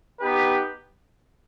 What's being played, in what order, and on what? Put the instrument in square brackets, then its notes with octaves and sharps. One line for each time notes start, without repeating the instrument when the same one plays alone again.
[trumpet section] B3 D#4 G4 B4